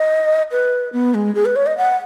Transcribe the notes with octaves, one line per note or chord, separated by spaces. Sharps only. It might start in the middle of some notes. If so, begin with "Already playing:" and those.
Already playing: D#5
B4
B3
G#3
G#4
B4
C#5
D#5
F#5